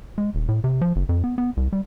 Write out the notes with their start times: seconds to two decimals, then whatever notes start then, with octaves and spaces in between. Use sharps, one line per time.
0.18 G#3
0.35 D#1
0.48 A2
0.64 C3
0.81 F3
0.96 F#1
1.09 F2
1.24 B3
1.38 B3
1.57 C2
1.73 G3